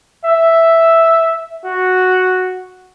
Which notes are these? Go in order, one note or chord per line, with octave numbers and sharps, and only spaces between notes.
E5
F#4